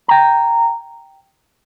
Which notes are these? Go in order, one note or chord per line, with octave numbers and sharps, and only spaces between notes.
G5 A#5